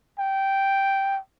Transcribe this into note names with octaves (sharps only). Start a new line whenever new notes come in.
G5